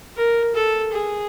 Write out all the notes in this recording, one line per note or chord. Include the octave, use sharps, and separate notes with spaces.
A#4
A4
G#4